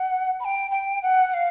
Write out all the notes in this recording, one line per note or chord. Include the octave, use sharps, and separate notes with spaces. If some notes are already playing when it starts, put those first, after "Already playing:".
Already playing: F#5
B5
G5
G5
F#5
F5